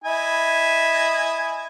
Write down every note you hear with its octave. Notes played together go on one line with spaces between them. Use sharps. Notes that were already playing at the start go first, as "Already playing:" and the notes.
E4 D#5 G#5